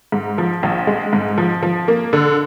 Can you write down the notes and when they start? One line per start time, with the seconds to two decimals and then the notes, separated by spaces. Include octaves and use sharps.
0.12 G#2
0.38 F3
0.63 A#1
0.87 G#3
1.13 G#2
1.38 F3
1.63 F3
1.88 A#3
2.13 D3